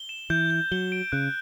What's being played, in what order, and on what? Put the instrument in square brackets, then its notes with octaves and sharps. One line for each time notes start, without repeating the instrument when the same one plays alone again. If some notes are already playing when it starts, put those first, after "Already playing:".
Already playing: [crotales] G7
E7
[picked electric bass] E3 [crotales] G6
[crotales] G6
[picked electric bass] F#3 [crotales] G7
[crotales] D7
[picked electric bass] C#3 [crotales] F#6